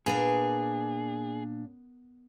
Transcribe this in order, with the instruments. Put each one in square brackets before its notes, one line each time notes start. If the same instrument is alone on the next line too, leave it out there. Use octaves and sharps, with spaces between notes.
[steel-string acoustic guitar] A#2 D4 [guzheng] B3 A#4 [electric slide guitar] G#4